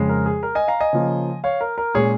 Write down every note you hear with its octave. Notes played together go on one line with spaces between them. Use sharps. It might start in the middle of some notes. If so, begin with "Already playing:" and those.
Already playing: F2 C#3 G#3
A#4
G#4
A#4
D#5 G#5
F5 A#5
D#5 G#5
C#3 F3 A#3
C#5 F5
A#4
A#4
A#2 G#3 C#4 G#4 C#5